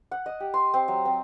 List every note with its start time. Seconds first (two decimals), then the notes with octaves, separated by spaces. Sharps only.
0.11 F#5
0.26 D#5
0.40 G4
0.54 C6
0.74 C4
0.88 F#3
1.05 C4